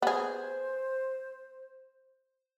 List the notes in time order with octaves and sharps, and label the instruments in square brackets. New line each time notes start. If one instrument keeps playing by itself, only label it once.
[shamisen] B3 G#4 [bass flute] C5